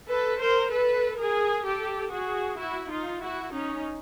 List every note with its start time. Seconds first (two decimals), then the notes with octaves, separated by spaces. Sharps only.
0.09 A4 B4
0.40 A#4 C5
0.72 A4 B4
1.19 G#4 A#4
1.65 G4 A4
2.12 F#4 G#4
2.59 E4 F#4
2.90 D#4 F4
3.21 E4 F#4
3.52 C#4 D#4